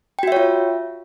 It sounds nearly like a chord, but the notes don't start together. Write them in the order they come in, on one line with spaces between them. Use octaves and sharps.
G5 F#4 E5 C#5 F4